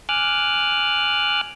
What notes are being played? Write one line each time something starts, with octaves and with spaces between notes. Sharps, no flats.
G#5 D6 F6 F#6